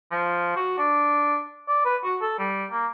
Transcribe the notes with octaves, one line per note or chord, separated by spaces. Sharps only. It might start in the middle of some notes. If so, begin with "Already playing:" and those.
F3
F#4
D4
D5
B4
F#4
A4
G3
A#3